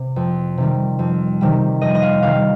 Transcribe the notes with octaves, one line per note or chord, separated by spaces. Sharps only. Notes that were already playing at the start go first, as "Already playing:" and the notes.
Already playing: C3
F2
C3 D#3 G3
F2
C3 D#3 G3
F2 D#5
D#5
F5
C3 D#3 G3 F5